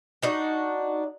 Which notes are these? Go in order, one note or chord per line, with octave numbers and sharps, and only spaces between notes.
D4 D#4 F#4